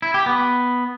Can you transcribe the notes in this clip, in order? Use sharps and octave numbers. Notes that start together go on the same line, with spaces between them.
E4
G4
B3